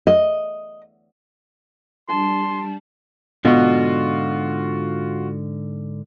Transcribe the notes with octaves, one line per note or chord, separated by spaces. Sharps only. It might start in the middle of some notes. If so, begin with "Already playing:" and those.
D#5
G3 D4 A5 C6
G#2 B2 D3 F4 F#4